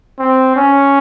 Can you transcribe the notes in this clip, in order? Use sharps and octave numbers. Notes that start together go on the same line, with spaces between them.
C4
C#4